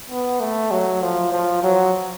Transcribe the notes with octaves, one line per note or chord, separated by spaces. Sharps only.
B3
A3
F#3
F3
F3
F#3